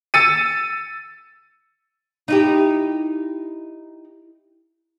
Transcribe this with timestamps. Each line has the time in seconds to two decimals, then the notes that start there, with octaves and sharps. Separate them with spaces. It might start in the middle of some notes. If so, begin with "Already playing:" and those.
0.14 E6 A6 C#7 D#7
2.28 D#4 E4 G4